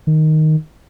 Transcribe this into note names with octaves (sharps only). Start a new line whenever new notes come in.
D#3